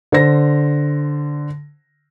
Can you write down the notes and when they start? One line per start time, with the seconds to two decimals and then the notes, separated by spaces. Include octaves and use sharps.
0.12 D3 C5 A#6